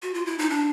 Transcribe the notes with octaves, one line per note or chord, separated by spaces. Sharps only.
F#4
F4
E4
D#4
D4